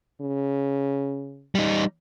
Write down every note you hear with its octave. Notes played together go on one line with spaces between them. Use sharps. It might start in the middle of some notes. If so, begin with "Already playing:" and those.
C#3
G3 D#4